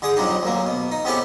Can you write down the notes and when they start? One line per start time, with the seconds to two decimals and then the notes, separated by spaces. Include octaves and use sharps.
0.02 D3 G#4 D#6
0.16 F2 F#3 G3 D4 D#4
0.43 D2 F#3 A#3
0.66 B2
0.92 D#4
1.05 C3 B3 C#4 E4 G4 A4